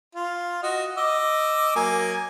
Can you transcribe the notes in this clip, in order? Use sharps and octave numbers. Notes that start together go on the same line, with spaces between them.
F4
F#4 D#5
D#5 D6 E6
F#3 A#3 G#5